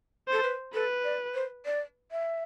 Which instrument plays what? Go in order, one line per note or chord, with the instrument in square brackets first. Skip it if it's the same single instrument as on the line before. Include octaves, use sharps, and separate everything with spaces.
[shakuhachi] A4 [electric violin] C5
[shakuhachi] B4
[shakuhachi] A4 [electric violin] B4
[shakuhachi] D5
C5
D5
E5